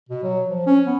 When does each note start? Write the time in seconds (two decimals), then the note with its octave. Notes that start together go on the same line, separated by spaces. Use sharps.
0.09 B2
0.23 F#3
0.49 F3
0.66 C#4
0.86 B3